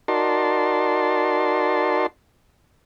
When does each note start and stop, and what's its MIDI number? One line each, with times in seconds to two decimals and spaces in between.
0.08 2.06 63
0.08 2.06 66
0.08 2.06 70
0.08 2.06 74
0.08 2.06 81
0.08 2.06 84